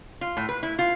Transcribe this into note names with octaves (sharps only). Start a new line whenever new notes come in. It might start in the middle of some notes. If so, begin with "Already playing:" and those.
F4
A2
B4
E4
F4